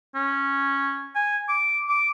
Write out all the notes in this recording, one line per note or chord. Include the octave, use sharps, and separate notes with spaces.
C#4
G#5
D6
D6